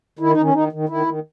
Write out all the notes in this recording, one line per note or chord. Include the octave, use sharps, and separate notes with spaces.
D#3 E4
D#4
D#3 C#4
D#3 D#4
D#3
D#3 E4
D#3